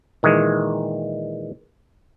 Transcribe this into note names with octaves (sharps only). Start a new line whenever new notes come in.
A#2 D#3 E3 G#3